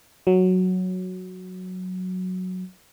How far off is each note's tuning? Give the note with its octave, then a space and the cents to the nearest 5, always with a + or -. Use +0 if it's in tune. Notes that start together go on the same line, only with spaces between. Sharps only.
F#3 -5